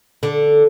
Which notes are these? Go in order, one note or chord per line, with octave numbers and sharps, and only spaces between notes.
D3